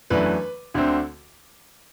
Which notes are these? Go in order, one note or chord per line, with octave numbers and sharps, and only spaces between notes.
F#2 E3 A3 D4 B4
D2 D3 A3 C4